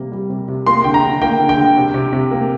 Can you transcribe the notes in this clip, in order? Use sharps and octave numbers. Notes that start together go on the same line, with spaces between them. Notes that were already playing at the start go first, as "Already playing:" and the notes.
Already playing: C3 G3 A#3
G3
C3
C3
A#3 C6
D3 G5
A#5
D3
A#3 G5
D3
G5
D3
C3
C3
C3
A#3